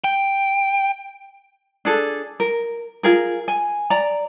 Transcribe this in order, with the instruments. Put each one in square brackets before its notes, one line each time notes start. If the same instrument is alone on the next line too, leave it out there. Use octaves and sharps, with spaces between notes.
[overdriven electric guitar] G5
[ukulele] D4 G#4 A4
A#4
F4 G#4 A#4
G#5
D5 A#5